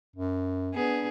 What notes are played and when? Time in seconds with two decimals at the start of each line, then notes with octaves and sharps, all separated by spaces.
0.16 F#2
0.74 B3 D4 G#4